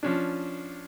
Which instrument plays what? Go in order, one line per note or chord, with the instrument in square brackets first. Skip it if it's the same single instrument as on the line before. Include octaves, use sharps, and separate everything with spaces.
[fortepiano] F3 C#4 D4